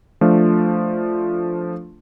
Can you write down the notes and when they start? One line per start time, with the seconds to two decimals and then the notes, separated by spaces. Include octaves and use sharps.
0.21 F3 A3 D4 F4